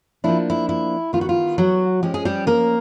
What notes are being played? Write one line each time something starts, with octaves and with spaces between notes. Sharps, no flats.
F3 A#3 D4 E4
E4
E4
D#3 G3 B3 F4
F#4
F4
F#3 F#4
F3 G#3 C#4 G4
G#4
G3 G4
A#3 A#4